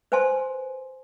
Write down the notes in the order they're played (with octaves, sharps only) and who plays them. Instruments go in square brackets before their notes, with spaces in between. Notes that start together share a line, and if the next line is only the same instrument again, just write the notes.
[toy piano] B4 C5 G#5 A5 C6